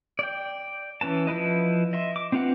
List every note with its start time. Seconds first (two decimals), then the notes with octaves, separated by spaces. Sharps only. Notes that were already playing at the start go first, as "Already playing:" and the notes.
0.19 D5 G5
1.01 E3 C#4 B4 A5
1.27 F3 E4 B4 D#5
1.93 D#5 E5 C6
2.16 D6
2.32 C4 D4 F4 B4 F#5